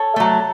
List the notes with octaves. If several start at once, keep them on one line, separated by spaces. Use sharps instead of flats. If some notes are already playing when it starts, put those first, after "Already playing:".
Already playing: A4 C#5
F#3 A3